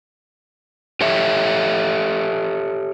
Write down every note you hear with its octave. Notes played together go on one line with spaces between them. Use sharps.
G4 A4 C#5 E5